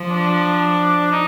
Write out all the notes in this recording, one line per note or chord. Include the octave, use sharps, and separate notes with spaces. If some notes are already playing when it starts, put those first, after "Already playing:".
Already playing: F3
D4
D#4